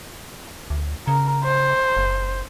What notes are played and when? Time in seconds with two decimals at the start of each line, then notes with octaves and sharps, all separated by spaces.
0.70 D2
1.08 C#3 A#4
1.44 C5
1.97 F#1